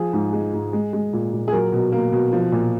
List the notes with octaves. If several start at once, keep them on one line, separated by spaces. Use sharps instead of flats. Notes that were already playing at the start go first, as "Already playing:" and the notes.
Already playing: F3 G#4
G#2
G#3
G#2
G#3
G#3
A#2
A#2
G#4
F#3 A#4
B2
A#3
B2
F3
A#2